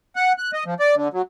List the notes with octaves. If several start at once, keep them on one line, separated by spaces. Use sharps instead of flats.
F#5
F#6
D#5
F3
D5
D3
F#3